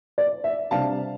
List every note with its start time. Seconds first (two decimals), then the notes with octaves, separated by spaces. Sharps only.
0.18 D5
0.44 E5
0.71 C3 G3 D4 F5 A5